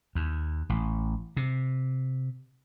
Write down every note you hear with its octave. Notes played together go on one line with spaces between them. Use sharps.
D#2
A1
C3